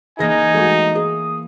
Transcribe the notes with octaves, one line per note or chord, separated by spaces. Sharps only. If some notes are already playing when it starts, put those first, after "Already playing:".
E3 A#3 D#4 G#4 G#5 A#6
G#3 A3 F#4
G#4 D#6